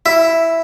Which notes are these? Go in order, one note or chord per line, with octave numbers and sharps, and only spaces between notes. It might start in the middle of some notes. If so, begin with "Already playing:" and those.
E4